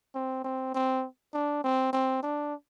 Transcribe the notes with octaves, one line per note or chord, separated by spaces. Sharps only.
C4
C4
C4
D4
C4
C4
D4